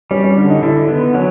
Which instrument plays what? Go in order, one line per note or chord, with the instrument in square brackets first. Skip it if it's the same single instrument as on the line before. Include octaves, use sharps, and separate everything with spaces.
[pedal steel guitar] G3 [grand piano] C#4
[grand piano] C#4
[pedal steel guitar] D3 [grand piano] D4
[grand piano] D#4
[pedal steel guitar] D3 [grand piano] E4
[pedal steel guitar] B3
[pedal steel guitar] F#3 [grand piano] C#4